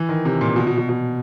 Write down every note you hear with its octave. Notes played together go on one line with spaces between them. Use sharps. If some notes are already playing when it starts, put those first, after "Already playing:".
Already playing: E3
D#3
C3
A#2
B2
B2
B2
B2